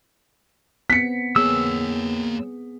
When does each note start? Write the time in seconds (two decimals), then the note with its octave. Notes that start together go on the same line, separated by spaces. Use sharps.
0.90 B3 C4 B6 C#7
1.36 A#3 B3 G#4 C#5 E6